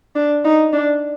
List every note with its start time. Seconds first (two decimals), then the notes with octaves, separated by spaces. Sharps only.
0.15 D4
0.45 D#4
0.73 D4